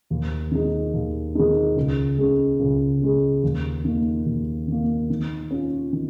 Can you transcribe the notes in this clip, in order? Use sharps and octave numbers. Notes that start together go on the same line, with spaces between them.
D#2
D#3 G#3 D#4
D#2
D#3 G#3 D#4
C#2
C#3 G#3
C#2
C#3 G#3
D#2
D#3 A#3
D#2
D#3 A#3
D#3
C#4 F4
D#3